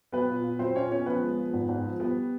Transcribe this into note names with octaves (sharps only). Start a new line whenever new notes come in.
F#3 B3 B4
A#2
A#2
F#3 C4 C5
A#2 C#4 C#5
B3 C#4 C#5
F3 B3 B4
G#3
F3
G#2
G#2
F3
G3 B3 B4